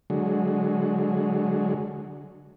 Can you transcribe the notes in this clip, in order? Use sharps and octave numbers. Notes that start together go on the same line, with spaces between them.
D3 F#3 G#3